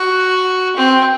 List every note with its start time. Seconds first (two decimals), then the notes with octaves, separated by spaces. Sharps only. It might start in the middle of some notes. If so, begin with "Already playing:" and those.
Already playing: F#4
0.76 C4